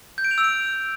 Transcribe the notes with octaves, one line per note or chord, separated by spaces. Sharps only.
G6
D7
F7
E6
D7